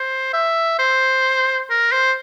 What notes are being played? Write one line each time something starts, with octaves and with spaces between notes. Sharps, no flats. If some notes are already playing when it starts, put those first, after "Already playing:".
Already playing: C5
E5
C5
A#4
C5